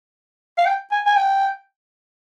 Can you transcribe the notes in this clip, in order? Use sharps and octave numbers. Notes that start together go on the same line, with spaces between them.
F5
G5
G#5
G#5
G5